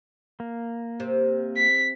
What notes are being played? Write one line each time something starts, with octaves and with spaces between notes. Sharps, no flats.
A#3
C3
B6